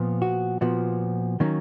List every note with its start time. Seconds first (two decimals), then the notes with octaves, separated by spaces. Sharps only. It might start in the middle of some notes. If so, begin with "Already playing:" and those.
Already playing: A#2 F3 B3
0.22 F#4
0.61 A#2 F3 B3 F#4
1.40 D#3 F#3 A#3 C#4